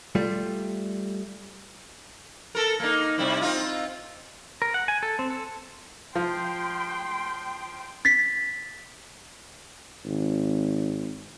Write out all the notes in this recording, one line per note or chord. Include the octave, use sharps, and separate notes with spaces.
G3 A3 F4
A4 A#4
A#3 D#4
C3 G3 E4
C4 D#4 F4
A#4
F#5
G#5
A4
C4
A4
F3 G5 C6
A6 B6
G#1